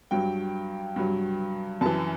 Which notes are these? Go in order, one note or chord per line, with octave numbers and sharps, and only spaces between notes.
G2 F#3 G5
G2 F#3
F#2 E3 A5